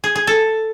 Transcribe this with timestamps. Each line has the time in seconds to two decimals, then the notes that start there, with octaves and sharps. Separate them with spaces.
0.04 G#4
0.16 G#4
0.27 A4